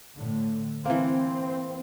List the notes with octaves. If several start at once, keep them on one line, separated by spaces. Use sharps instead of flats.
A2 D3
E3 A#3 C4